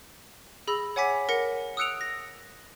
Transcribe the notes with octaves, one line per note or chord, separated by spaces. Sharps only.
G#4 B5 E6 A#6
C#5 F#5 G#5 D6 B6
A#4 F#5 A#6 C#7
D#6 E6 F#6 C#7 D7 F7
A#6